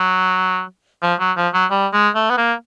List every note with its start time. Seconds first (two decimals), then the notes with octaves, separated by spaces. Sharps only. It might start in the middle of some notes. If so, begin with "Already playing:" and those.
Already playing: F#3
1.03 F3
1.20 F#3
1.37 F3
1.53 F#3
1.71 G3
1.93 G#3
2.15 A3
2.30 B3
2.38 A#3